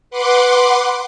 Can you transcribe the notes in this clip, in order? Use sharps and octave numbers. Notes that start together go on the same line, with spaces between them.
B4 F#5 C6 D6